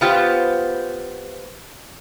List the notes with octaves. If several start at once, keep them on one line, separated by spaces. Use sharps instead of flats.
B3 F4 G4 C5